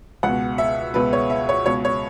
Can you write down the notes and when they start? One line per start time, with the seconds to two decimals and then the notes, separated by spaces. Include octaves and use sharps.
0.23 C#2 B2 F#5
0.58 E5
0.94 C#2 B2 B4
1.13 C#5
1.30 E5
1.49 C#5
1.66 C#2 B2 C#5
1.85 C#5